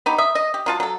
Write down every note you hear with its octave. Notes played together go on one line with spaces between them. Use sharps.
B3 D#4 G4
E5 D#6
D#5
G4
F#3 F4 A5
F#3 A4